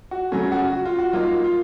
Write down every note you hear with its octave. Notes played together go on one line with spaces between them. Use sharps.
F#4
C#3 F#3 A3 C#4
F#4
F#4
F4
F#4
F#3 A#3 D#4 F4
F4